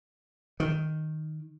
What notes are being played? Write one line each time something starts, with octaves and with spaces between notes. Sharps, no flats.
D#3